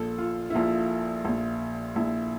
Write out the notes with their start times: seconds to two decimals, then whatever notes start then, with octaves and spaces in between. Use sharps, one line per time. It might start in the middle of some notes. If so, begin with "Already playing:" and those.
Already playing: A#1 A#2 A4
0.18 F4
0.50 E4
0.54 A#1 A#2 F4
1.25 A#1 A#2
1.96 A#1 A#2 E4